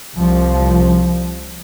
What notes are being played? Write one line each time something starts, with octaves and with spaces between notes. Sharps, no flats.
C2 F3